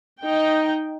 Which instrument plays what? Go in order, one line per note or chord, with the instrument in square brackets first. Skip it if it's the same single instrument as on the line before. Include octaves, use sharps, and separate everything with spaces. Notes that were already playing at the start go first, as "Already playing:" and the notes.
[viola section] D#4 G5